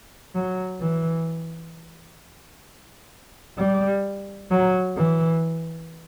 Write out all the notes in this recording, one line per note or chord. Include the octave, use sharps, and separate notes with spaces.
F#3
E3
G3
F#3
E3